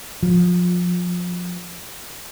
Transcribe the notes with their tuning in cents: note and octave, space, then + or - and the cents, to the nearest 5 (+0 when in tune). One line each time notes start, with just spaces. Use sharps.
F3 +25